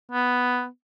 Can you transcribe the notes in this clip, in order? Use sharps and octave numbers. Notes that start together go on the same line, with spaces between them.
B3